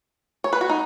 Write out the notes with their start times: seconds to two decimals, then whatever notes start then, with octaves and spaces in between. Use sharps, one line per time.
0.44 C#5
0.53 B4
0.61 F#4
0.69 D#4